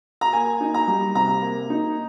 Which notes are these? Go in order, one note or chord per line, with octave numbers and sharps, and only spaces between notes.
A#5
A#3 G#5
D#4
A#5
G3
C3 A#5
A#3
D#4